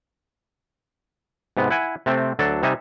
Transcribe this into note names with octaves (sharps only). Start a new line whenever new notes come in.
G#2 C3 B3
E4 F#5 G#5
C3 A3 C4
D2 F#3 D4 A4
C3 G3 D#4 E5 G#5